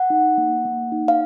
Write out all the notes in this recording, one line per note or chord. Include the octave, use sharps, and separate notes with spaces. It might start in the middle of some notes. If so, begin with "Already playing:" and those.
Already playing: F#5
D#4
A#3
A#3
D#4
F5